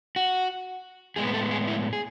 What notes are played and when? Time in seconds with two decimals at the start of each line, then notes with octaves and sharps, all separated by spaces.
0.16 F#4
1.16 A2 G#3 B3 G#4
1.27 B4
1.34 A4
1.51 G#4
1.67 E4
1.93 G#4